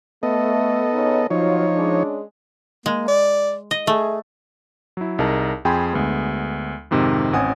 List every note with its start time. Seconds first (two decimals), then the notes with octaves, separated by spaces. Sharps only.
0.23 A3 B3 A4 D#5
0.92 C#3 C#4 D#4
1.30 F3 F#3 D#4 F4 C#5
1.75 G#3 C#4 D4
2.86 G#3 A#3
3.08 D5
3.71 D#5
3.87 A3 G#4
4.97 F#3 E4
5.19 C2 D#4 G#4 A#4 D#5 A5
5.65 F2 G#4 G5 G#5 B5 C6
5.93 D2 G#3 B3
6.91 F2 G#2 C3 D#3
7.33 A1 C4 C#4 F#5 G#5 D#6